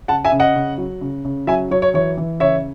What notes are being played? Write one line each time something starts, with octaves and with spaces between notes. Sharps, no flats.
C#3 F#5 A5
E5 G#5
C#3
D#5 F#5
C#3
F#3
C#3
C#3
F#3 E5 G#5
F#3 C#5
C#5
E3 C#5
E3
C#3 C#5 E5